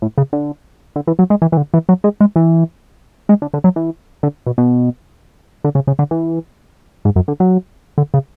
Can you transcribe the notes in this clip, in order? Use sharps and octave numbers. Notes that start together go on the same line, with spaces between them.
A2
C#3
D3
D3
E3
F#3
G#3
E3
E3
D3
E3
F#3
G#3
G#3
E3
G#3
D3
D3
F#3
E3
D3
B2
B2
D3
C#3
C#3
D3
E3
G#2
F#2
D3
F#3
D3
C#3